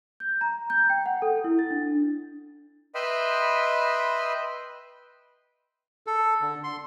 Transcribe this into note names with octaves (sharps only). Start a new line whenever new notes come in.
G6
A#5
G6
G5
F#5
A4
E4
A6
D4
B4 D#5 E5 G5 B5 C6
A4
D3
C6